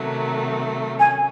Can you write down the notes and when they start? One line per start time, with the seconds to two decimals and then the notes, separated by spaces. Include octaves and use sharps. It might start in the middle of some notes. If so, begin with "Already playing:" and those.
Already playing: C3 D#3 F#3 A3
0.99 C#4 G#5